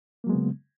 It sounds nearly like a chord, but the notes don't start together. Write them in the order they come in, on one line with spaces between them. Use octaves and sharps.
A#3 F#3 G#3 B3 C#3